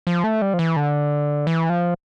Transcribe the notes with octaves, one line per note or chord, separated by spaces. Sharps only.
F3
A3
G3
F3
E3
D3
E3
F3